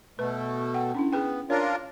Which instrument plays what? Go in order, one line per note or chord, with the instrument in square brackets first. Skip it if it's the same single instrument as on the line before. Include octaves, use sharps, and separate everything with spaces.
[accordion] B2 A3 [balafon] B4
[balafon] F#5 G5
C#4 D4 E4
[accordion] B3 [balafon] G#4 B4 G5
[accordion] D4 F4 A#4 [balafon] C#5